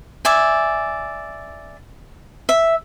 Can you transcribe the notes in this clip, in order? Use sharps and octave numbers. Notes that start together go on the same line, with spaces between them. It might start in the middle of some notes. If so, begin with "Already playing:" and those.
D5 E5 G#5
E5